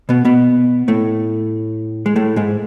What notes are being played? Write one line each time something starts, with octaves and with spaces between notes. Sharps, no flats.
B2 B3
B2 B3
A2 A3
G#3
A2 A3
G#2 G#3